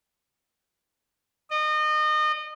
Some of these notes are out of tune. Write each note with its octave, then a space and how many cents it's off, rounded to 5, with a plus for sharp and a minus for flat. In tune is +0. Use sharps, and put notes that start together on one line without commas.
D#5 -30